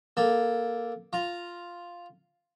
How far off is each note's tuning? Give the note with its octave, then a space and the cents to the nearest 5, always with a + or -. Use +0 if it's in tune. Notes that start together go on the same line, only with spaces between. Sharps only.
A#3 +10 A4 +0
F4 +0 A#5 -5